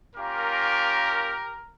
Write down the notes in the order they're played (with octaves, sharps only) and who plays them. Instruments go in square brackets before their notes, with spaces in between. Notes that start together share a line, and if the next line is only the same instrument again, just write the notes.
[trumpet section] A#3 C#4 F4 G4 A#4